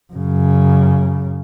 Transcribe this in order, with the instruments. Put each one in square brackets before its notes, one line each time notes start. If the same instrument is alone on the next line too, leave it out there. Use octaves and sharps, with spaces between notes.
[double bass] F#2 C#3